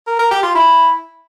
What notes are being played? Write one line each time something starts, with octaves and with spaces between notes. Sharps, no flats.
A#4
A#4
G4
F4
E4